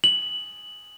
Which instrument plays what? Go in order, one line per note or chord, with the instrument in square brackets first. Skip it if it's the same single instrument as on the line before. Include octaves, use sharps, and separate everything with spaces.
[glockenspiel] F#7